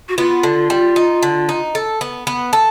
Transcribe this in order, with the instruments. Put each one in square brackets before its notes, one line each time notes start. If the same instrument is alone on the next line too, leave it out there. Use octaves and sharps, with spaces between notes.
[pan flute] F#4
[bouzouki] B3 [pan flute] F4
[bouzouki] D3
G3
D#4
D3
D#4
A4
B3
B3
A4